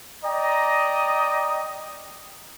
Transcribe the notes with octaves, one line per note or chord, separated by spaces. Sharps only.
D5 D#5 G5 A#5